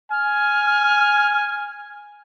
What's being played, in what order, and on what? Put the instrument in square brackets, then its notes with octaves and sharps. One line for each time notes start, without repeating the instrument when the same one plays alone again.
[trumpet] G#5 [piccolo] F6